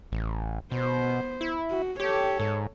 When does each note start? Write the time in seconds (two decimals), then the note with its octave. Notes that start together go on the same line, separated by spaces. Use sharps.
0.12 A1
0.72 B2 B3 C5
1.41 E4
1.70 F#4
2.00 G4 A4 C#5
2.40 G#2